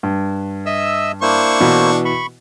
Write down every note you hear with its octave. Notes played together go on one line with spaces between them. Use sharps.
G2
D#5 E5 E6
A#3 D4 E4 C5 C#6
B2 E3
B5 C#6